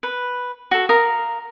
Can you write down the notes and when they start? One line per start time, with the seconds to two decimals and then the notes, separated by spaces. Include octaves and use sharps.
0.03 B4
0.71 F#4 A4
0.89 A#4 F5 D#6